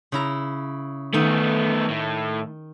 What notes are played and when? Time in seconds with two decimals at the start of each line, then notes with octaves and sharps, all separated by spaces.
0.12 C#3 E4 A#5
1.14 D#3 A3 B3 D#4
1.90 A2